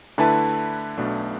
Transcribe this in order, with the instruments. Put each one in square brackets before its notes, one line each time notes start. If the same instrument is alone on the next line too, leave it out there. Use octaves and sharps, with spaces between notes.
[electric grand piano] D3 A3 E4 B4 [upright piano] A5
[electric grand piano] B1 B2 A3 D4